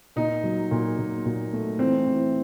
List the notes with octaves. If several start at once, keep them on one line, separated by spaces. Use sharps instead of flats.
A#2 D#4
F#3
A#2
A#2
A#2
A3
E3 C4
E3